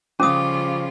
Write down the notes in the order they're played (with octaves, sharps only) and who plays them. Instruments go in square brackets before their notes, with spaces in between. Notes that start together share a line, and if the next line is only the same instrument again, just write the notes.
[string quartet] C#3 G3 F4 [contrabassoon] F3 [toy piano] C#4 D#6 [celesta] D6